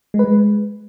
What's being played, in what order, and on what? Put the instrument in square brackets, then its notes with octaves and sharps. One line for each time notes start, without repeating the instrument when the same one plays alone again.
[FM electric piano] G#3
B4
G#3